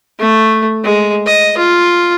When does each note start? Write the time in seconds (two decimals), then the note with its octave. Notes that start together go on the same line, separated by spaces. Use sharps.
0.20 A3
0.84 G#3
1.26 D#5
1.58 F4